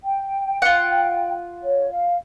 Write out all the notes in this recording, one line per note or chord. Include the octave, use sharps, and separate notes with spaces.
G5
F4 F#5
C#5
F5